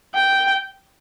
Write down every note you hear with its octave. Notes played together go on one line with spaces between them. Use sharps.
G5